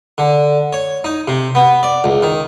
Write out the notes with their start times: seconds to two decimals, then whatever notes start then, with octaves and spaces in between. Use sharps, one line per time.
0.18 D3
0.73 C#5
1.04 D#4
1.28 C3
1.55 B3
1.83 D5
2.04 C#2
2.23 D#3